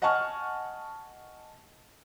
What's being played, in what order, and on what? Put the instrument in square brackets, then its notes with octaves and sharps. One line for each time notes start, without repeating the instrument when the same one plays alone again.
[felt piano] D#5 F#5 G#5 A5 C#6 F6